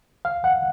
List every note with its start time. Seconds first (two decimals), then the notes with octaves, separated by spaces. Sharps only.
0.25 F5
0.44 F#5